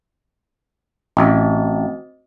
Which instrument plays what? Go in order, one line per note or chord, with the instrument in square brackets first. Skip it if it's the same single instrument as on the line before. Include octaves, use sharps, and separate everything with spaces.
[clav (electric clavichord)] A1 [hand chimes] C4 F#4 D#5